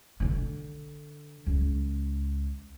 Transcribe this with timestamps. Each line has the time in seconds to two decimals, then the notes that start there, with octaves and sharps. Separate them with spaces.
0.20 D3 D4
1.47 C#2